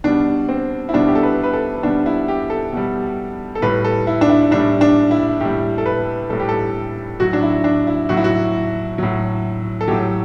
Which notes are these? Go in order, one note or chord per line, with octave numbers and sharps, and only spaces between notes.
B2 G3 D4
C4
E4
B2 G3 D4
G4
A4
B4
B4
A4
B2 G3 D4
E4
G4
A4
B2 G3
A4
A2 G3 B4
A4
E4
D4
E4
A2 G3 D4
D4
E4
A2 G3 G4
A4
B4
A2 G3 A4
G4
A4
A2 F#3 F#4
D4
E4
D4
E4
A2 F#3 F#4
E4
F#4
A2 F#3
A4
A2 F#3 G4